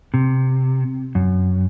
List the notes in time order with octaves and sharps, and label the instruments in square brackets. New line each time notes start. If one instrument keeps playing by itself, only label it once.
[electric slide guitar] C3
F#2